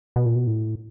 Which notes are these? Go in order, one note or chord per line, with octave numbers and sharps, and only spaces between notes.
B2
A#2
B2
A2